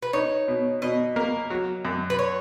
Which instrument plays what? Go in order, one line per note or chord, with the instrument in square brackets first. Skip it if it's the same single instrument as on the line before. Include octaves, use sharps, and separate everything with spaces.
[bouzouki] B4
[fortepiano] D#4 [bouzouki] C#5
[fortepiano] B2
[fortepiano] B2 [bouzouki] D#5
[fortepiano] A#3
F#3
F#2
[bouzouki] B4
C#5